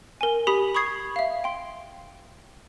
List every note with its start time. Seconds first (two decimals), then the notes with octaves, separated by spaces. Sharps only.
0.21 A#4 G#5
0.47 G4 B5 D#6 B6
0.75 B5 C#6 D#6 G#6 C7
1.16 E5 F5
1.44 G5 C6